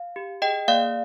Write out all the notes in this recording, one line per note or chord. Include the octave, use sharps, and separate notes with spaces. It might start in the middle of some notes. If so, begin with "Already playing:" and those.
Already playing: F5
G4
G#4 D#5 G5
A#3 D5 F5